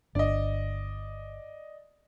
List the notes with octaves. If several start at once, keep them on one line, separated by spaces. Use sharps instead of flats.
G1 D4 D5 D#5